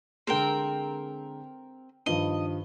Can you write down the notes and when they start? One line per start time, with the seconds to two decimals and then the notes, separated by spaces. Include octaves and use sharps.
0.27 D3 G#3 C4 A#4 G5
2.06 G2 D#3 F3 D#5